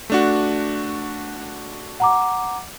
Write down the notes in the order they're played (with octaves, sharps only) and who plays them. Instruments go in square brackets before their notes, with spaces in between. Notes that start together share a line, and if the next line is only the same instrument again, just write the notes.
[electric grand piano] A3 D4 F#4
[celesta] F#5 A#5 D6